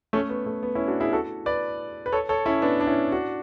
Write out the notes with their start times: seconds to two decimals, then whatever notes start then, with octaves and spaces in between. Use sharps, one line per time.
0.13 A3 C#4
0.30 B3
0.46 A3
0.63 B3
0.75 C#4 E4
0.88 D4 F#4
1.00 E4 G#4
1.13 F#4 A4
1.46 B4 D5
2.06 B4
2.12 A4 C#5
2.29 A4 C#5
2.46 C#4 E4
2.62 B3 D4
2.80 D4
2.87 C#4 E4
3.12 D4 F#4